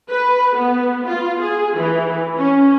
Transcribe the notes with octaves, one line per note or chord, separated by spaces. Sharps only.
B4
B3
F4
G#4
E3
C#4